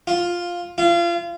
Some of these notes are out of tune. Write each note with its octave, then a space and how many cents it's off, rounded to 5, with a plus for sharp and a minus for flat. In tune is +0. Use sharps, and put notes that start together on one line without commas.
F4 +5
F4 -30